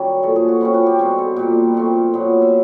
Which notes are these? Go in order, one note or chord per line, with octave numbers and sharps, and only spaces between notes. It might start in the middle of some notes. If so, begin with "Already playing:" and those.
Already playing: F#2 D#3 G3 C#4 C#5
A#2 F3 A3 A4
G#4
F#4
C3 F3 A3 C#4 E4
F#4
G4
B2 G3 C4 G#4
A4
A#2 G3 A#3
A#2 F3 A3 C4
A#2 F#3 B3
E5